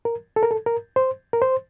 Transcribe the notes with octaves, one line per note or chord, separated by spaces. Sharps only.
A#4
A4
A#4
A4
A#4
C5
A#4
C5